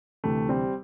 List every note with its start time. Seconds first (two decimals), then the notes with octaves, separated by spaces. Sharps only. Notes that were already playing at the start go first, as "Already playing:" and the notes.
0.24 D2 C3 E3 A3
0.49 G3 C4